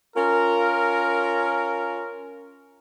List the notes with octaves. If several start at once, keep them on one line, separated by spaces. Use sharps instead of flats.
C#4 F4 A#4